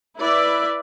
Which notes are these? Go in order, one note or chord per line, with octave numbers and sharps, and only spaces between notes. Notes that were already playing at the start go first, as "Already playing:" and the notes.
E4 B4 D5 E5